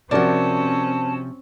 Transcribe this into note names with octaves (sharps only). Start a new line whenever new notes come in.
C3 F3 C4 C#4 F#4 A#4 D5 A5